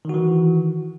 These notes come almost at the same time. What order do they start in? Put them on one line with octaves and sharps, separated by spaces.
D#3 F#4 E3